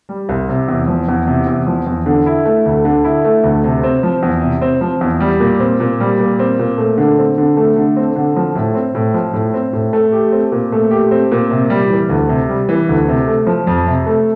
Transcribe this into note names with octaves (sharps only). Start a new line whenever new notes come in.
G3
C2
C3
E2
F3
E2
C3
E2
F3
E2
D3
E4
A3
D2
D3
E4
A3
D2
C3
C4
F3
E2
C3
C4
F3
E2
G3
A#2
C4
A#2
G3
A#2
C4
A#2
A3
D3
C4
D3
A3
D3
C4
D3
F3
A2
C4
A2
F3
A2
C4
A2
A3
G4
C4
A#2
A3
G4
C4
A#2
C3
G3
E3
D2
C3
G3
E3
D2
C3
A3
F3
F2
C3
A3